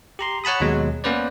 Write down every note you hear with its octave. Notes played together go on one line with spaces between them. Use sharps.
G4 A#5 C6
C#5 F#5 A5 B5 D#6
D#2 B2 F#3 G#3
A#3 B3 C#4 B4 C5 D5